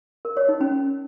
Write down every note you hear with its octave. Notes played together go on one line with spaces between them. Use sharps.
A#4
C#5
D#4
C#4